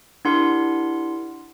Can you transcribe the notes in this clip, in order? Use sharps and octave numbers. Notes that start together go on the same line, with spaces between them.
D4 E4 G4 A#4 F#5 C6